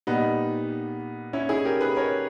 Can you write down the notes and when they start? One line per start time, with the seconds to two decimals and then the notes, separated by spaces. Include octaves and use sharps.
0.07 A#2 G3 B3 D#4
1.33 C#4 E4
1.49 E4 G#4
1.65 G4 A#4
1.81 G#4 B4
1.96 A#4 C#5